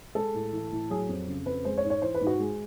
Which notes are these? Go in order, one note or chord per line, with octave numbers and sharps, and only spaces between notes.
G#3 A4
A2
E3
A2
F#3 G#4
F2
C#3
F2 B4
G#3 C5
C#5
G#2
C#5
E3 C5
B4
G#2
F#4
G#3